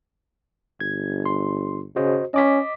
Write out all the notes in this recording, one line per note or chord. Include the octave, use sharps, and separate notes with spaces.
G1 G#6
C6
C#3 F#4 C5 D#5
C#4 D#5 D6 B6